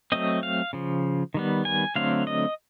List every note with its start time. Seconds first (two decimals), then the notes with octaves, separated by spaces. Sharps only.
0.12 F#3 A3 C4 D#5
0.43 F5
0.73 C#3 F3
1.34 D#3 G3 B3
1.65 G#5
1.96 D3 F#3 A3 C4 F5
2.27 D#5